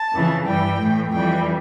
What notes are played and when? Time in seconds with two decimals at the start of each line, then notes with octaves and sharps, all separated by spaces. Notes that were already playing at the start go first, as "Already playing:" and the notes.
Already playing: A5
0.12 F2 C#3 E3
0.45 G2 E3 G3 G5
0.79 A2 E3 A3
1.11 F2 E3 G3 G5